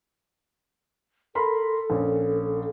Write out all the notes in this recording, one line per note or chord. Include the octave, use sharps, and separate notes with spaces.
A4 A#4 B5 C6
A#1 C#4